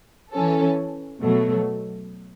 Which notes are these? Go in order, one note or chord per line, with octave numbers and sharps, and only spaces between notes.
E3 C#4 A4
B2 F#3 A3